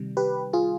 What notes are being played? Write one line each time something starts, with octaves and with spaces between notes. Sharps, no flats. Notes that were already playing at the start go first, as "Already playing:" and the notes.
Already playing: C3 D#3 G3
G4 B4
F4 G#4